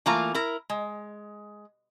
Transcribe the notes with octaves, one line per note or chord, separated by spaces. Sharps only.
E3 A3 A#3 F4 A#5
E4 A#4
G#3